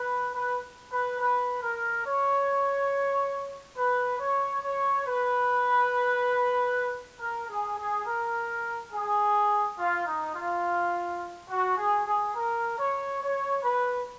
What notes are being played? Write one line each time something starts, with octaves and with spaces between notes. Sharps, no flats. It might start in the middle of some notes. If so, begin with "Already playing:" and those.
Already playing: B4
B4
B4
B4
A#4
C#5
B4
C#5
C#5
B4
A#4
G#4
G#4
A#4
G#4
F4
D#4
F4
F#4
G#4
G#4
A#4
C#5
C#5
B4